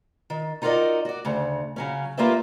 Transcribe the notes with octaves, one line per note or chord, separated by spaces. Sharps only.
D#3
D#4 F4 F#4 A#4 D5 D#5
F#4 D5
D2 C#3
C#3 F#3 C#4
A#3 F4 G4 B4 D5 E5